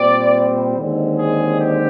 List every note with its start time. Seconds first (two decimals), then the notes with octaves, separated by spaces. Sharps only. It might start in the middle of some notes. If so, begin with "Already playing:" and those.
Already playing: A#2 G3 C4 D5
0.77 D#2 D3 G#3 C4
1.17 G#4
1.59 G4